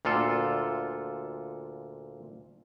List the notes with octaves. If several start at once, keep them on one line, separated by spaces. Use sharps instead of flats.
D2 A#2 F4 A4